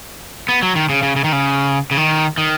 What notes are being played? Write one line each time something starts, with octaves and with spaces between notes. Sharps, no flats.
B3
F#3
D#3
C#3
C#3
C#3
D#3
C#3
C#3
D#3
D#3